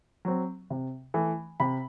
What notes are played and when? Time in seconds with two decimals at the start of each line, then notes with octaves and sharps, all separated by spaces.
0.25 F#3 C4
0.70 C3
1.14 E3 A3
1.60 C3 B5